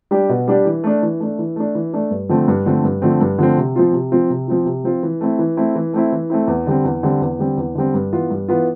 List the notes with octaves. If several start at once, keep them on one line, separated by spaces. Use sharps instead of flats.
G3 D4 G4
B2
G3 D4 G4
E3
A3 D4
E3
A3 D4
E3
A3 D4
E3
A3 D4
G2
D3 F3 A3 C4
G2
D3 F3 A3 C4
G2
D3 F3 A3 C4
G2
D3 F3 A3 C4
C3
F3 C4 F4
C3
F3 C4 F4
C3
F3 C4 F4
C3
F3 C4 F4
E3
A3 C4 E4
E3
A3 C4 E4
E3
A3 C4 E4
E3
A3 C4 E4
E2
D3 G3 C4
E2
D3 G3 C4
E2
D3 G3 C4
E2
D3 G3 C4
G2
E3 B3 F4
G2
E3 B3 F4